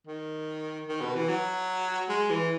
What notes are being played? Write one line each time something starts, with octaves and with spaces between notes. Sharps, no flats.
D#3
D#3
B2
E3
F#3
G#3
E3